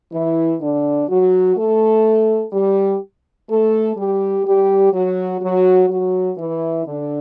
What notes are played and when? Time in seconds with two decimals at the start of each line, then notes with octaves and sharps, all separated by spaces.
0.12 E3 E4
0.60 D3 D4
1.09 F#3 F#4
1.57 A3 A4
2.52 G3 G4
3.48 A3 A4
3.96 G3 G4
4.44 G3 G4
4.92 F#3 F#4
5.41 F#3 F#4
5.88 F#3 F#4
6.37 E3 E4
6.85 D3 D4